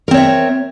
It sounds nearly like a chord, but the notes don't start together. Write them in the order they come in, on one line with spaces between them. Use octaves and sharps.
A#4 C4 C#5 E5